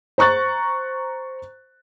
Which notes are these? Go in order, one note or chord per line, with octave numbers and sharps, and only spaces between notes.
C5 A#5 C#6 F#6 A6